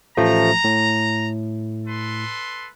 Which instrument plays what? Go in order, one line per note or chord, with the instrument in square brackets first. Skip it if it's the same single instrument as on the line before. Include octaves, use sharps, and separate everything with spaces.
[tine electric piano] A1 F3 A3 [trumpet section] A#5
[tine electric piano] A2
[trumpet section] A4 B4 C6